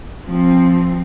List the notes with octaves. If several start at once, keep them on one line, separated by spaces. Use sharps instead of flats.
F3 C4